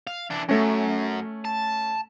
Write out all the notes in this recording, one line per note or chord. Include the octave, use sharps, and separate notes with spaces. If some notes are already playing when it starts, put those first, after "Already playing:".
F5
E3 D4
F#2 A3 C#4
A5